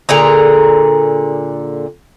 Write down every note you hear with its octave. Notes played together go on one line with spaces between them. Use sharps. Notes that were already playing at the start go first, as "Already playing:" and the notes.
A#2 D3 G#4 A#5